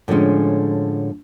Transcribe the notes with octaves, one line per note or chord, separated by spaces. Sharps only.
A2 D3 F3 G3 G#3 C#4